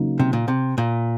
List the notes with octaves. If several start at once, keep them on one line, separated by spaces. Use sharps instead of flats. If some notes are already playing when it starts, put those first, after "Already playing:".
Already playing: C#3 F#3 A#3 D#4
C3
A#2
C3
A#2